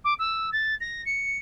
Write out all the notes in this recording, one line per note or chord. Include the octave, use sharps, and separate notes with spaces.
D6
E6
A6
A#6
C#7